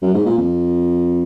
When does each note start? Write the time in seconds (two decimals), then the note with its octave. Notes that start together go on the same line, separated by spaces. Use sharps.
0.02 F#2
0.14 G#2
0.26 A#2
0.37 F2